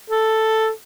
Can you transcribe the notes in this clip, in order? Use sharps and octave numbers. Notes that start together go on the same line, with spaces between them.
A4